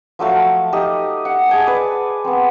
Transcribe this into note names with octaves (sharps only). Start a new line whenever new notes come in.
F3 F#3 A3 F5
D#4 G4 D#5
F#5
G#4 G#5 A5
B4 D5
B3 C4